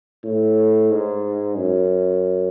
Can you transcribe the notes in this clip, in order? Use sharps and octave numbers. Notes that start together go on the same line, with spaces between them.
A2
G#2
F#2